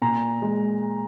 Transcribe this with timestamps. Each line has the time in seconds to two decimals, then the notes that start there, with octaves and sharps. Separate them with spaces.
0.02 A#2 A#5
0.42 G#3